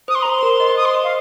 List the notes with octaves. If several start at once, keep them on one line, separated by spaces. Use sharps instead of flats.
C5 D#6
C6
A#5
C5
C6
C5
A#4
C5
D#5
C5
D#6
C6
C5
D#5
F5